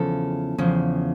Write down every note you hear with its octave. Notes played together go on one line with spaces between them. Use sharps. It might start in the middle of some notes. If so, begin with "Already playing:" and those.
Already playing: E2 C#3 F3 A4
E2 C#3 F3